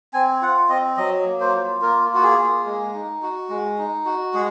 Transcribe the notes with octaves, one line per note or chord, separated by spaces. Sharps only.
C4 G#5
F4 F#5
C4 D#5
F#3 D#5
A#3
C5
F4
A#3 A#4
F4 F#4
G#4
A#3
G#3
D#4
F#4
G#3
D#4
F#4
G#3 G#4